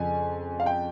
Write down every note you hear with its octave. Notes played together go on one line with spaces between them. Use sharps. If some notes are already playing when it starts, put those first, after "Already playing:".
Already playing: F2 C#3 F3 G#5
F5
G5